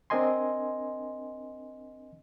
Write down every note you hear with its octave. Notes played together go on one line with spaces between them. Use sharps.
C4 D4 A#4 D#5 G#5 C6